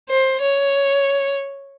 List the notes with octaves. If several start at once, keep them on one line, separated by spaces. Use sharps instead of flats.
C5
C#5